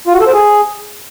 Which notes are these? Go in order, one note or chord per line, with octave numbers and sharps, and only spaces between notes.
F4
F#4
A4
C5
G#4